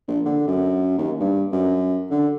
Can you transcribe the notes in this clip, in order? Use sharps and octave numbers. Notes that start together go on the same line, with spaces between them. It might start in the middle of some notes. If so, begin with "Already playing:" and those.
A#1
D3
F#2
D#2
G2
F#2
D3